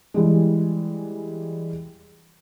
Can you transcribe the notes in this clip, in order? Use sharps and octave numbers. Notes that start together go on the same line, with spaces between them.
E3 G3 G#3